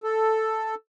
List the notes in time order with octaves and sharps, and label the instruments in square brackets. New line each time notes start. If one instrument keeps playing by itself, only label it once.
[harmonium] A4